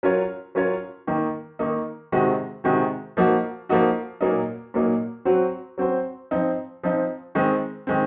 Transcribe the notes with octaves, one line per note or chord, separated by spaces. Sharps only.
F#3 C#4 F4 A#4 C#5
F#3 C#4 F4 A#4 C#5
D#3 A#3 D#4
D#3 A#3 D#4
C3 D#3 G#3 C4 F#4
C3 D#3 G#3 C4 F#4
F3 A#3 D#4 F#4
F3 A#3 D#4 F#4
A#2 F#3 A#3 D#4
A#2 F#3 A#3 D#4
F#3 C4 F#4 C5
F#3 C4 F#4 C5
F3 C4 D#4
F3 C4 D#4
D#3 G#3 C4
D#3 G#3 C4